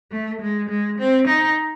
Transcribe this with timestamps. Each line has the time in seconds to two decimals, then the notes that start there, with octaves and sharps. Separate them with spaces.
0.12 A3
0.41 G#3
0.70 G#3
0.99 C4
1.28 D#4